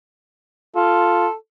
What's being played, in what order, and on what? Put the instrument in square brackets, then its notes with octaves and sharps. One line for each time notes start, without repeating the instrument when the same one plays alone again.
[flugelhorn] F4 [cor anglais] A4